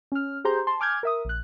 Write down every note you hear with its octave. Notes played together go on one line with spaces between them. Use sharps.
C#4 F6
G4 G#4 C5 A#5 C6 G6
A5 C6
G#5 D6 F6 G6 G#6
A#4 E5 D#6
A#1 F#6